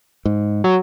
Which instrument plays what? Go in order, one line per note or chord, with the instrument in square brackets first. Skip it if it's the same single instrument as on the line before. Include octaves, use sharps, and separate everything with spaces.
[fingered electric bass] G#2
[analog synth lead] F#3